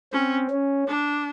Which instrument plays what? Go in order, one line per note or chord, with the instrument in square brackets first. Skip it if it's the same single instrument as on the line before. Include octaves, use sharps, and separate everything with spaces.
[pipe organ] C4 [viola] C#4
[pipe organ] C#4
[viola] D4